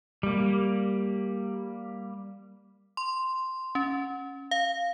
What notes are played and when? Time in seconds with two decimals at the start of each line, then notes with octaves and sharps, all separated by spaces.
0.23 G3 A#3
2.97 C6
3.75 C#4
4.51 F5